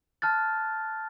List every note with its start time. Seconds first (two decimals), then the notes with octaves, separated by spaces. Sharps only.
0.22 A5 F6 F#6 A6